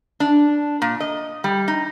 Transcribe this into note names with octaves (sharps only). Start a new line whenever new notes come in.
D4
A#2
D#5
G3
D#4